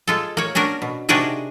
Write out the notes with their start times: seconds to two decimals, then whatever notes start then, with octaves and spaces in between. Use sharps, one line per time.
0.07 G#3 F4 A4
0.37 A#3 C#5
0.55 C#4 D4 F#4 A#4
0.82 B2
1.09 C3 D4 D#4 F#4 G#4 A#4